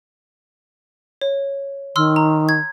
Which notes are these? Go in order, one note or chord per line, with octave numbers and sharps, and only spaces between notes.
C#5
D#3 C6 E6 F6
A#5
G#6